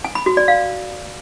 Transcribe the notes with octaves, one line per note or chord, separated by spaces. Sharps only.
G#5
B5
F#4
D5
F5